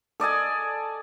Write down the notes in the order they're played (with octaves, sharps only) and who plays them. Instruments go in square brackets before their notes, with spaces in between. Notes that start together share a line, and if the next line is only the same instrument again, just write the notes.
[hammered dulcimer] A4 D5 D#5 G#5